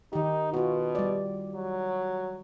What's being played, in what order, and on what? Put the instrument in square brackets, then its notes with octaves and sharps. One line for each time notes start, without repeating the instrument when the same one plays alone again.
[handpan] D#3 G4 [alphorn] D#4
[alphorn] B2 [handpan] F4 F#4
[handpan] G3 D5
[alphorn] F#3